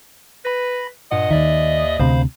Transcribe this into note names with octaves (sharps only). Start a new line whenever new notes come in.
B4 B5 A#6
G2 A#2 D#5 F#5
D#2 D#3 D5 E5
D2 C3 C5 F5 B5